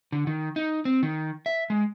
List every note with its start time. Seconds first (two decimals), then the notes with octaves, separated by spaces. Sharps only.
0.12 D3
0.27 D#3
0.56 D#4
0.85 C4
1.03 D#3
1.46 E5
1.70 G#3